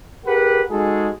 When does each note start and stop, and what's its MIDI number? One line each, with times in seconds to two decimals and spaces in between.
0.26 0.63 67
0.26 0.63 68
0.26 0.63 70
0.26 0.63 71
0.26 0.63 78
0.70 1.10 56
0.70 1.10 63
0.70 1.10 66
0.70 1.10 68
0.70 1.10 69